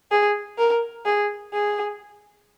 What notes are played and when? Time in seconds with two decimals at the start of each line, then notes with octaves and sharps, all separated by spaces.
0.11 G#4
0.58 A#4
1.06 G#4
1.53 G#4